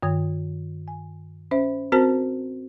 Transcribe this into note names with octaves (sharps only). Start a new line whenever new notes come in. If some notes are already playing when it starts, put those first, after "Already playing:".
G2 D#3 G#6
G#5
C#4 C5 E5
C4 F#4 A#4 C5 A5